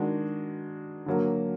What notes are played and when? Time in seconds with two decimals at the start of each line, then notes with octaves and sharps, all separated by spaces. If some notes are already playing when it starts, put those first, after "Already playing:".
Already playing: D#3 G#3 D4 F#4
1.06 D3 F#3 A#3